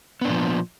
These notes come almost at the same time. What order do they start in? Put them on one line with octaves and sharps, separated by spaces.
B3 D4 A#2 F3